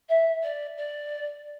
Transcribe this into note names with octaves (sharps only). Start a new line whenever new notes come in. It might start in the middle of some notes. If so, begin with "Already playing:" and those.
E5
D5
D5